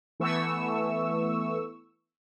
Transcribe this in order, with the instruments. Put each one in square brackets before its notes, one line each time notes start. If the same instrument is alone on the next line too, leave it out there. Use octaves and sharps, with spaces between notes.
[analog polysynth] E3 A3 B3 C#6 E6